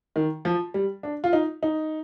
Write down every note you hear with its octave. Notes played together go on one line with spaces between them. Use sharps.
D#3
F3
G3
D4
F4
D#4
D#4